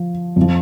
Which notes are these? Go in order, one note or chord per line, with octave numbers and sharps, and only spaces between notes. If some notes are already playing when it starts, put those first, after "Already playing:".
Already playing: F3
F2
F3